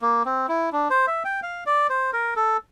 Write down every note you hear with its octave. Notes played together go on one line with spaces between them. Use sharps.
A#3
C4
E4
D4
C5
E5
G5
F5
D5
C5
A#4
A4